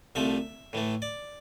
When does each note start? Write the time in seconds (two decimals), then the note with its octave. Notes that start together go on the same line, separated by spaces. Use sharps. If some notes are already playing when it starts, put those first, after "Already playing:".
0.15 C2 C3 F3 A3 E5
0.73 A2 E3 A3
1.02 D5